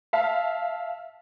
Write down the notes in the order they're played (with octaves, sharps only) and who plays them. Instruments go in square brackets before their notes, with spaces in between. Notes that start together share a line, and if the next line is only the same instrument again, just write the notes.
[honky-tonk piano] E5 F5 A5